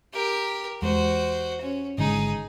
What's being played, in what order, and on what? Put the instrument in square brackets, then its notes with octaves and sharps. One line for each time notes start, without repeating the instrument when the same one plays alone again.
[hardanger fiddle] G4 A#4
[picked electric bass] E2 G#3 [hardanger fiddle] F#4 C5
[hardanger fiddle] C#4
[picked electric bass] G#1 D3 G#3 [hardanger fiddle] D#4 G#4